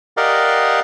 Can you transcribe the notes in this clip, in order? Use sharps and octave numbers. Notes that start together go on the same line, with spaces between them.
G4 A#4 D5 D#5 F5 F#5